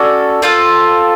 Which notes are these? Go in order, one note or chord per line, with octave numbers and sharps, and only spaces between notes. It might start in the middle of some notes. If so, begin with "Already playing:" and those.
Already playing: C#4 F#4 A4 D5
C4 F4 A4